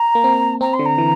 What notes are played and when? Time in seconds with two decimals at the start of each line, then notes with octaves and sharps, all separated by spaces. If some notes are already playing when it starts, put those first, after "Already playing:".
Already playing: A#5
0.15 A#3
0.24 C4
0.61 C4 A#5
0.73 C6
0.79 D3
0.85 A#5
0.98 E3